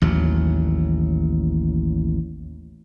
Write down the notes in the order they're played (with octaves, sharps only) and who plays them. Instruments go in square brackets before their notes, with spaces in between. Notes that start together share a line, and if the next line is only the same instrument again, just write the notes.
[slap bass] A1 D#2 F#3